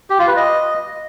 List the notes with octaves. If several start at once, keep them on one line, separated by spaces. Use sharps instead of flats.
G4
F4
B4
D#5